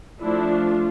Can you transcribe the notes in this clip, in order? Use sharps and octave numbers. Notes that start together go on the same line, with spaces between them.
F3 A3 D4 E4
F4